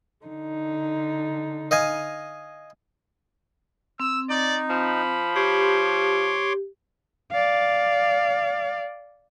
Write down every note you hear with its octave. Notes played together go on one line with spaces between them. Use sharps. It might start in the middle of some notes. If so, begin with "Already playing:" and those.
D3 D#4
D#5 F5 G#5
C4 E6
D#4 D5
F3 B5
G4 C#5 C6 D6
D5 F5